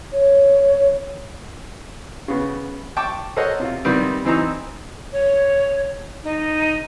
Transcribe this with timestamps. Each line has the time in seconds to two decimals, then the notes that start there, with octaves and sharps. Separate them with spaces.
0.12 C#5
2.28 C#3 B3
2.97 G5 A5 C#6 D6
3.36 A4 A#4 C5 C#5 D#5 F#5
3.60 C3 F4
3.85 C3 D#3 G3 B3 C4
4.25 E3 C4 D#4 A#5 E6
5.13 C#5
6.24 D#4